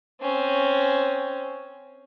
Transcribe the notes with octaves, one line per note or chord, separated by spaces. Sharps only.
C4 C#4